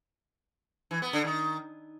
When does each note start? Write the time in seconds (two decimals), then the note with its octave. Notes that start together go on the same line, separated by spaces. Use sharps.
0.91 E3
1.02 B3
1.13 D3
1.24 D#3